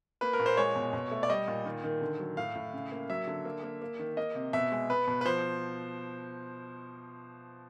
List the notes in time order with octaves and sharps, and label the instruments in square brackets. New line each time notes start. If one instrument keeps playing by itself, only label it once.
[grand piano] A#3 B4
A#4
A#2
C5
G#3 C#5
B2
B2
A3
D5
G3 D#5
A#2
D#3
D#3
D3
F#3
A2 F5
A2
C#3
A#3
F#3 E5
D3
A#3
A#3
A#3
D#3
A#3 D#5
C3
B2 E5
G#3
B3 B4
B2
B4
F3 C5